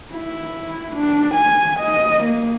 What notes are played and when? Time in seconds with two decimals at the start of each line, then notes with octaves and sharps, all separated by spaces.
0.15 E4
0.96 D4
1.35 G#5
1.80 D#5
2.24 A#3